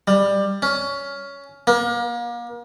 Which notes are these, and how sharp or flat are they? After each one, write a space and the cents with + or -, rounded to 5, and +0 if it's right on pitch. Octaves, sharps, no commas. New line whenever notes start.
G3 +15
C#4 +15
A#3 +35